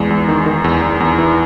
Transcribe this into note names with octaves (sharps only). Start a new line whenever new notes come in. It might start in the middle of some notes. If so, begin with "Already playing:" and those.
Already playing: E2 G#3
E2
D#3
D#3
E2
E2
E2
E3